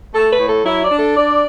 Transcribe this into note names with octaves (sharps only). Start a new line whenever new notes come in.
A3 A4
B4
A2
A4
F#3 E4
D5
D4
A4
D4 D5